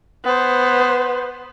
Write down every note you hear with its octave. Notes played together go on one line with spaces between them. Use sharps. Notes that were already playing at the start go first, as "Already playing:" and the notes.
B3 C5